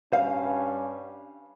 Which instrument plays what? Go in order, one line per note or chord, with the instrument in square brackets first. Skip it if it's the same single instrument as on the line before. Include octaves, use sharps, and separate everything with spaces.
[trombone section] G2 C#4 [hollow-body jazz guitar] F5